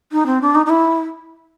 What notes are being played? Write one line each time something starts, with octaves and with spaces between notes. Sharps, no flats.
D#4
C4
D4
D#4
D#4
E4